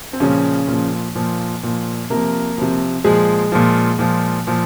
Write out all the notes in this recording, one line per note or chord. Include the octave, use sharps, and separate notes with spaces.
C4
A#2 C#3 F3 C#4
A#2 F3
A#2 F3
A#2 F3
C3 F3 A#3 A#4
C3 F3
A#2 F3 G#3 G#4
A#2 F3
A#2 F3
A#2 F3